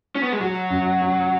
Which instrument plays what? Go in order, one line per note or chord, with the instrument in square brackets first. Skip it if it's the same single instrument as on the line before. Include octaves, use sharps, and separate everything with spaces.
[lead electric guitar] C#4
B3
G#3
[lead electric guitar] F#3 [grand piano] F#4
[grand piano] F#2
C#4